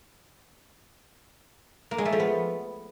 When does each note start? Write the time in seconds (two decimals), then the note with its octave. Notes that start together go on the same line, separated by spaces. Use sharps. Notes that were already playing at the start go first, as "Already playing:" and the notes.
1.91 A#3
1.98 G#3
2.05 A3
2.12 F3
2.20 B3